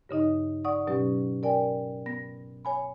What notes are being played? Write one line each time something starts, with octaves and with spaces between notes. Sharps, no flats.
G2 C#3 D#4 D#5
D5 F#5 C#6 D#6
B2 F#3 C#4 G4
A#4 D5 G5 G#5
B3 A#6
C#5 G#5 B5